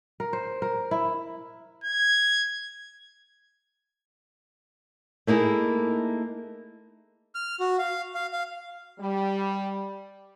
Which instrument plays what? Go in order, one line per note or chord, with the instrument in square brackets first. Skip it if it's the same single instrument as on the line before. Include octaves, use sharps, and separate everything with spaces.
[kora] A#4
C5
A#4
E4
[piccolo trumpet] G#6
[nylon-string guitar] A3 A#3 D#4 E4 G#4
[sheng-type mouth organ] F6
F#4
F5
F5
F5
[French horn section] G3